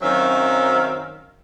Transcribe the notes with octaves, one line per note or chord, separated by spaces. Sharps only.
F#2 D#3 F#3 C4 E5 F5